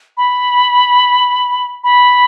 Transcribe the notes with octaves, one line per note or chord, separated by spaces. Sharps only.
B5
B5